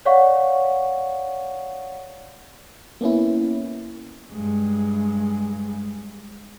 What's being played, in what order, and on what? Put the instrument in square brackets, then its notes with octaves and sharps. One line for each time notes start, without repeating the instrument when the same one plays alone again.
[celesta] C#5 D5 F5 F#5 C#6
[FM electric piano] A#3 B3 C#4 E4
[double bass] G2 G#3